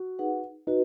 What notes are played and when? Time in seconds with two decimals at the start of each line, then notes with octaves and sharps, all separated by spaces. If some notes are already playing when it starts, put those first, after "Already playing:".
Already playing: F#4
0.19 D#4 G#4 B4 F#5
0.67 D#4 F#4 B4